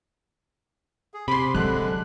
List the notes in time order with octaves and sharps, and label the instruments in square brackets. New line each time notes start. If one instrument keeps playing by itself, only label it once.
[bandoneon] G#4
[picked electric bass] C3 [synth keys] B5 C6 [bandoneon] D6
[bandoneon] D3 G#3 D4 [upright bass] F#3 [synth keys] F#6